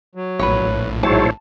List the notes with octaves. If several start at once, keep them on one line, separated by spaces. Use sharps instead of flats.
F#3
A#1 A2 B4 C#5
G#2 F#3 E4 C5 C#5 A5